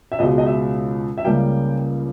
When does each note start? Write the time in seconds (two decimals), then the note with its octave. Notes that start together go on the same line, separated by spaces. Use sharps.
0.12 E5
0.19 C#2 B2 G#3 D#5
0.38 D#5
0.46 E5
1.18 E5
1.25 C#2 C#3 G3 A#3 G5